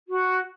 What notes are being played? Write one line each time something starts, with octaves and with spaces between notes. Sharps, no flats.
F#4